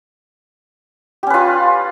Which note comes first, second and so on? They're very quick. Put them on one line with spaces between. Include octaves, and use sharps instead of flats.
G4 C#4 B4 F4